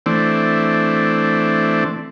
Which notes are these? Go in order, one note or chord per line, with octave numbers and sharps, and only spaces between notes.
E3 A3 C4 D4